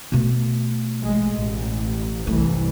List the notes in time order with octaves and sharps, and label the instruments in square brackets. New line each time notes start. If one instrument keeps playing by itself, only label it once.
[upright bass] B2 A3
[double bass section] A1 G#3
A1
[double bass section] C2 G2 E3 [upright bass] A3